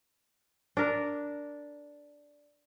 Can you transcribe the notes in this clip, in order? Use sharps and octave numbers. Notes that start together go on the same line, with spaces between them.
D4 A#4